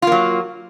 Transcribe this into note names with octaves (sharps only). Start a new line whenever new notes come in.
F#3 A#3 F4